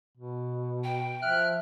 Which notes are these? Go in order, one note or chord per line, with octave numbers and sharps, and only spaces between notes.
B2
G5
F3 E5 F6 F#6